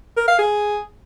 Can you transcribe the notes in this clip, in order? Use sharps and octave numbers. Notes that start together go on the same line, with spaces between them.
A#4
F5
G#4